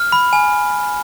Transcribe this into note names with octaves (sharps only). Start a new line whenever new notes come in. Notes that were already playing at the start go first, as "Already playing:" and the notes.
Already playing: F6
B5
G#5